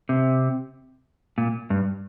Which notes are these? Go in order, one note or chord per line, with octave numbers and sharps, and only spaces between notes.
C3
A#2
G2